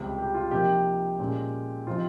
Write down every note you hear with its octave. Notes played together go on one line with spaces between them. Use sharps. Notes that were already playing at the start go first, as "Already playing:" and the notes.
Already playing: C#2 C3 G3 G4
G4
F4
C3 F3 A#3 D#4 G4
A#2 G#3 C#4
C3 F3 C4 D#4 F4